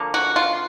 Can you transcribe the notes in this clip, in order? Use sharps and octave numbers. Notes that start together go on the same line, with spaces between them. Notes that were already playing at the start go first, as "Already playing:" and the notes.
Already playing: D3 F3 A#3
F#4
F4